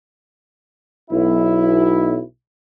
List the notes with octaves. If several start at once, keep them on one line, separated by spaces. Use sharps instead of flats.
B1 E4